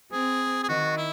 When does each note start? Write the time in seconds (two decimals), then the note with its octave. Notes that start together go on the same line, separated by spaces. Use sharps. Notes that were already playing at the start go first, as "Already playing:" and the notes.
0.12 C4 G#4
0.63 G#4
0.69 D#3 F#4
0.97 E4